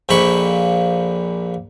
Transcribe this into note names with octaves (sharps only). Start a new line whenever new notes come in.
A#1 F2 A#2 E4 B5 C#6